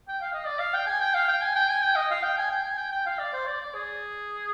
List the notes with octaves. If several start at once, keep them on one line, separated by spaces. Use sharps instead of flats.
G5
F5
D#5
D5
F5
G5
G#5
G5
F5
G5
G#5
G5
G#5
G5
D#5
F5
G5
G#5
G5
G#5
G5
G5
F5
D5
C5
D5
D5
G#4